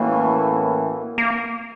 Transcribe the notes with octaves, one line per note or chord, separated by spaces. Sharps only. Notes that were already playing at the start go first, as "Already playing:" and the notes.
Already playing: A2 E3 A3 A#3 C#4 F#4
A#3